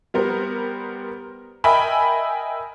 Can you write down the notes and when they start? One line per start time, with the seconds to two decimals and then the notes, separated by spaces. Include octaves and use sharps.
0.14 G3 B3 A#4 C5
1.64 A#4 D#5 E5 G5 G#5 B5